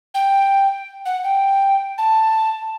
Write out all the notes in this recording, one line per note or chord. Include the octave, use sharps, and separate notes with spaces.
G5
F#5
G5
A5